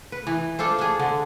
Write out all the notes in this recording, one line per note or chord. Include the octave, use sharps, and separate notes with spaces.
B4
E3
D4 F4 A4 C5
D4 G#4
D3